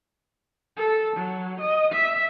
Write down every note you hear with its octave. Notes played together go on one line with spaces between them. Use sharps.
A4
F#3
D#5
E5